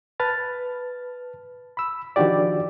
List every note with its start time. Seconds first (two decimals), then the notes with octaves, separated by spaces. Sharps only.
0.20 B4 A5 F6 A6
1.77 B5 E6
2.16 D#3 F3 D4 F#4 G4 D5